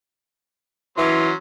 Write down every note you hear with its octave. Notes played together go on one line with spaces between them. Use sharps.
E3 F#3 C#4 C6